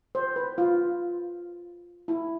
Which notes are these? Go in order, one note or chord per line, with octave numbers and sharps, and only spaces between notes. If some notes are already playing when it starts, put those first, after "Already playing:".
C5
B4
F4
E4